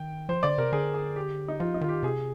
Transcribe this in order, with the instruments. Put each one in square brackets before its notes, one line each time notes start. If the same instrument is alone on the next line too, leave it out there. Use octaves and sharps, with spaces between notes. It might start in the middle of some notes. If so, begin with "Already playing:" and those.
Already playing: [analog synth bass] D#3 [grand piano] G5
[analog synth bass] F3 [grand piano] C5
[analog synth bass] D3 [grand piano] D5
[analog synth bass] C3 [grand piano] A#4
[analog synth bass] D3 [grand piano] G#4
[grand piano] G#4
G4
D#4
[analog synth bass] F3 [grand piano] F4
[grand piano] D#4
[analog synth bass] D#3 [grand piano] F4
[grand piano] G4
[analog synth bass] C3 [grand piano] G#4